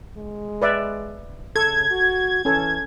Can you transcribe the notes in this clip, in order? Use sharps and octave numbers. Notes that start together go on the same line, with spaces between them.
G#3
B4 D5 E5
C#3 A4 G#6
F#4
E3 C#4 A4